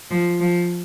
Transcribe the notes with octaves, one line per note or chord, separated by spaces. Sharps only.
F3
F3